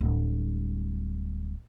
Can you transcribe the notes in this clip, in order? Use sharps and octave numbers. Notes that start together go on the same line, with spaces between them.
D1 G3